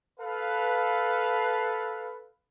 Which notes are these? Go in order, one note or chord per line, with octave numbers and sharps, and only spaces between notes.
A4 B4 F5